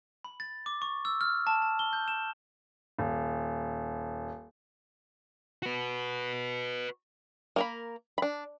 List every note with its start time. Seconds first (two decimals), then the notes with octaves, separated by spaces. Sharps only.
0.24 B5
0.40 A6
0.66 D6
0.82 C#6
1.05 E6
1.21 F6
1.47 A5
1.62 A5
1.79 G7
1.93 G6
2.08 E7
2.99 D#1
5.63 F#4 B4
7.56 A#3 A#4 B5
8.18 D4 B5